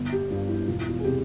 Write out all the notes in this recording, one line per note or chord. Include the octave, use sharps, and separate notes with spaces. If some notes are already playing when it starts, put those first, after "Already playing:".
Already playing: G1
G4
G2 F3 F4
E4
E1 F4
E4
F4
G#4
C3 F3 G4